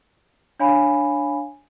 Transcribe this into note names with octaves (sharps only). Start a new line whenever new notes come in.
D4 C#5 F5 G#5 B5